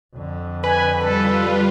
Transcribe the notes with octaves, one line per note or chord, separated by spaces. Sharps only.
F2 D3
B4 G#5
G3 F4 A4